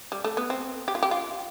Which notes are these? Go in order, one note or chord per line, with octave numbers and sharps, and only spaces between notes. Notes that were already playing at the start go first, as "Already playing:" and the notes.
G3
A3
B3
C4
G4
F4
G4
F4